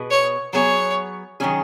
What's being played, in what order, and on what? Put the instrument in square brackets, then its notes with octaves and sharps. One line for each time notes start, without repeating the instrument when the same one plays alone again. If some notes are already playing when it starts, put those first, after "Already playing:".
Already playing: [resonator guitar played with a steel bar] B2 B3 G#4 B4 D#5
[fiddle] C#5
[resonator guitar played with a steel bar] F#3 B3 G#4 [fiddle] C#5
[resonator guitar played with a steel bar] D#3 F#3 C#4 G#4